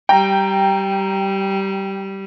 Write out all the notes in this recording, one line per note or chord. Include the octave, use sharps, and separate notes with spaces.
G3 G5 A#5